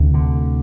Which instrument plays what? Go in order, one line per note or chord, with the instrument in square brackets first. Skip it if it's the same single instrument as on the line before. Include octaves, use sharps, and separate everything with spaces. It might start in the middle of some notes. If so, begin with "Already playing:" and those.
Already playing: [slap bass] D2 C3
D3